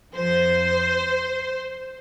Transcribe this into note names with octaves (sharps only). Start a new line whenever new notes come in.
F2 F3 C5